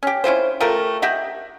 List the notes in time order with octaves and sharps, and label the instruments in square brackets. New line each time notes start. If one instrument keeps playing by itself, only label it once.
[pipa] C#4 G4
C#4 E4 F4 C5
A3 F4 G4 A#4
G4 D#5 E5 F#5